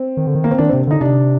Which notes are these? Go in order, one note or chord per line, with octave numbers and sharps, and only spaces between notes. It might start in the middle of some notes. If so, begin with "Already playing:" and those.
Already playing: C4
D#3
D3
D#3
A#3
C4
D#3 D4
C3 C4
D3 D#4
C3 D4